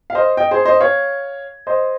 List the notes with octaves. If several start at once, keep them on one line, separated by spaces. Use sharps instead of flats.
F5
C5 D#5
D#5 G5
G#4 C5
C5 D#5
C#5 F5
C5 D#5